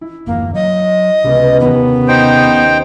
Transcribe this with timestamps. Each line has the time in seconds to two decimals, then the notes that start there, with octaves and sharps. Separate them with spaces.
0.01 E4
0.27 D#1 F#2 E3 A#3
0.54 F#3 D#5
1.24 C#2 C3 B3 C4
1.60 D#2 B3 C#4
2.08 D#4 C5 G5